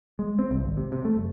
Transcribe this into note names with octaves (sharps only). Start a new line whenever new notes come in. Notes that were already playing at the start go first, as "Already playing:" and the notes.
G#3
C4
C2
G#1
C3
C3
A3
F#1